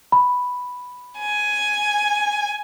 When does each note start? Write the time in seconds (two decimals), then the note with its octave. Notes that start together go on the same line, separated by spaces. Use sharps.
0.12 B5
1.19 G#5